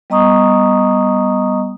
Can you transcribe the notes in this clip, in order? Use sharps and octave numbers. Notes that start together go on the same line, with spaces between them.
G3 B3 D#5 A#5 C#6 D#6